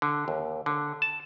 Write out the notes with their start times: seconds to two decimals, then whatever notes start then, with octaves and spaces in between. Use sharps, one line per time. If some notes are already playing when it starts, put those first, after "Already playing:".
0.02 D3
0.28 D#2
0.66 D3
1.02 A5